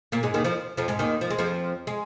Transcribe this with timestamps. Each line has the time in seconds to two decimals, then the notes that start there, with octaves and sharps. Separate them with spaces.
0.12 A#2 A#3
0.23 G#2 G#3
0.34 D#2 D#3
0.44 F2 F3
0.77 F2 F3
0.88 G#2 G#3
0.99 D#2 D#3
1.21 F3
1.30 G#3
1.38 F2 F3
1.87 G#3